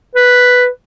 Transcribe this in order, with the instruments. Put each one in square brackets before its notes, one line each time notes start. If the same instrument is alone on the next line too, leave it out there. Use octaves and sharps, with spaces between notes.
[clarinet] B4